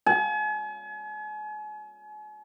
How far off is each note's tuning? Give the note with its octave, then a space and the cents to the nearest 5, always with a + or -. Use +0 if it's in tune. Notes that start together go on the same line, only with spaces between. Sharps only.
G#5 +40